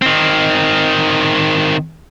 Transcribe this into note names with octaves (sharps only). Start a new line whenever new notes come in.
D#3 C4